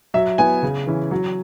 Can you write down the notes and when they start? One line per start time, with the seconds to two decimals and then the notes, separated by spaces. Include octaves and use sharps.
0.14 F#3 E5
0.38 B3 E4 G#5
0.63 C#3
0.87 E3 C#4 E4
1.11 F#3